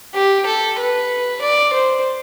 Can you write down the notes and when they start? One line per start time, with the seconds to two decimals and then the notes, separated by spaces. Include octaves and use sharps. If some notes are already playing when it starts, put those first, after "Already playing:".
0.14 G4
0.46 A4
0.79 B4
1.42 D5
1.73 C5